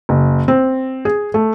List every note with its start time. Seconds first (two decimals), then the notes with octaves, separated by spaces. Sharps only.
0.09 F#1
0.48 C4
1.05 G#4
1.34 A3